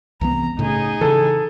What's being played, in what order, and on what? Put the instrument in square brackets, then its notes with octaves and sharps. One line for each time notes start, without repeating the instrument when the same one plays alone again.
[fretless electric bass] C2 E3 B3 [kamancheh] A#5
[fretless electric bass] A2 C#3 [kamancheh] D#4 G#4
[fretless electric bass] C#3 E3 [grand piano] A4